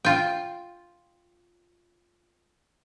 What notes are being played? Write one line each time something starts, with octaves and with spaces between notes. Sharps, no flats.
F4 G5